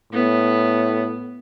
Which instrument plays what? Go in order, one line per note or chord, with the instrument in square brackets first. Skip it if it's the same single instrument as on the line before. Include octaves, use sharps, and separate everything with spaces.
[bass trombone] A2 [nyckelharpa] B3